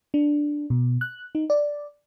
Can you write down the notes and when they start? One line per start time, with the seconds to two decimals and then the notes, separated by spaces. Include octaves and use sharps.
0.14 D4
0.70 B2
1.01 F#6
1.35 D#4
1.50 D5